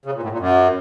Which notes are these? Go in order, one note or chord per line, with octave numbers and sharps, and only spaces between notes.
C#3
A#2
A2
A#2
F#2